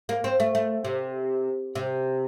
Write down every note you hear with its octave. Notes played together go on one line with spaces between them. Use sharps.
A#3
C4
A3
A3
C3
C3